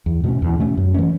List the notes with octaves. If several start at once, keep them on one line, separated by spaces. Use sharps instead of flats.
E2
B2 A3 C#4
E2
B2 A3 C#4
F#2
E3 A3 C#4